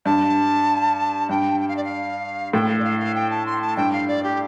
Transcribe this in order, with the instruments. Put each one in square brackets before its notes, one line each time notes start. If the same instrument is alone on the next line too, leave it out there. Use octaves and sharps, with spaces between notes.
[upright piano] G2 [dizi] A5
[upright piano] G2 [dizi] G5
[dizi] G5
F5
D5
F5
[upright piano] A2 [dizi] G5
[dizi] F5
D5
F5
F5
G5
A5
C6
A5
[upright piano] G2 [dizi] G5
[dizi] F5
D5
G4